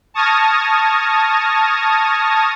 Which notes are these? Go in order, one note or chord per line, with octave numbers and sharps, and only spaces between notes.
A5 C#6 D#6 F6 G#6 A#6